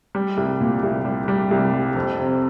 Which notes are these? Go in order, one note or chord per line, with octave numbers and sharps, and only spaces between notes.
G3
C2
A#2
C2
G3
G3
C2
G3
F2
C3